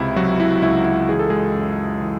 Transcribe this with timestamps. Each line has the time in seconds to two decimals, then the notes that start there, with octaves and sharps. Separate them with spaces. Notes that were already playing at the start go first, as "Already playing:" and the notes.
Already playing: C#2 C3 E4
0.16 C3 F#3 F#4
0.40 E4
0.62 C#2 E4
0.85 E4
1.09 E3 G#4
1.19 A4
1.30 G#3 G#4
1.54 F#2
2.02 E3